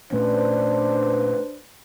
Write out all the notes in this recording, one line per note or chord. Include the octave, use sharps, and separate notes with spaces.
A#2 A3 C#4 D4 B4 C5